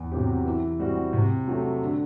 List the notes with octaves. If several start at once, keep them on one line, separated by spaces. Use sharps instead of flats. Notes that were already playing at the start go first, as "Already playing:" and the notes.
Already playing: E2
C3 F#3 C4 G4
E3
G3 C4 F#4
C3
F#3 A3
D3